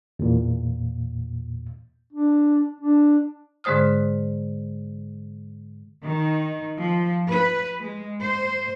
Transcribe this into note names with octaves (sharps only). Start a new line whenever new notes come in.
E2 A#2
D4
D4
G#2 D3 G#3 C5 D#6 F6
D#3
F3
B4
G#3
C5